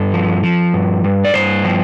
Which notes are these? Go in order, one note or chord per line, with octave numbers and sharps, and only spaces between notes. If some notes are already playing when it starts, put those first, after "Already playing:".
Already playing: G2 A4
F3
F3
G2
G2
D5
G2 C5
F3